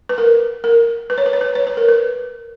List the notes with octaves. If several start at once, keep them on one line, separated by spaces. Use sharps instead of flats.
B4
A#4
A#4
B4
C#5
B4
C#5
B4
C#5
B4
A#4
B4